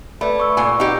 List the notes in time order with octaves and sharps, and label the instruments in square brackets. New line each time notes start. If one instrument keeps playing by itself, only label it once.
[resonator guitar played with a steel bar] A3 [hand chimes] B4 D5 B5
[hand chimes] C#6 E6
[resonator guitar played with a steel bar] A#2 G#5
[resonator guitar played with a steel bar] D#4 G4 [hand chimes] F#5